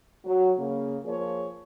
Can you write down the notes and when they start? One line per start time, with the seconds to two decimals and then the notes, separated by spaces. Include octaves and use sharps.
0.24 F#3
0.58 C#3 A#3
1.04 F3 A#3 G#4 C#5